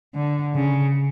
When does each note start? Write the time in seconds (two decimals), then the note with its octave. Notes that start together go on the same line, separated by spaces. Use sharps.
0.15 D3
0.55 C#3